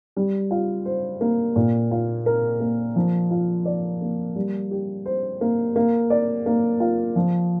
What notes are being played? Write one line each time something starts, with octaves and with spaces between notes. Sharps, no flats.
G3
F4
C5
A#3
A#2
F4
A#4
A#3
F3
F4
D5
A#3
G3
G4
C5
A#3
A#3
D5
A#3
F4
F3